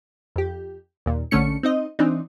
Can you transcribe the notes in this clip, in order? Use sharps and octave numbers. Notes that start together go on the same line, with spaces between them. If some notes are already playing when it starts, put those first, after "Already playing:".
F2 G4
D#2 A#2
A#1 D3 A3 C#4 C#7
C4 D#4 D#5
E3 C4 D4 D#4